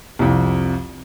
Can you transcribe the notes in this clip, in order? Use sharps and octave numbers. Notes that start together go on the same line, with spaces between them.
C2 F2